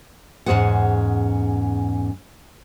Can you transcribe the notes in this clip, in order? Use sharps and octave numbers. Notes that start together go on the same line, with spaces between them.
E2 G#2 C#4 G#4 C5 F#5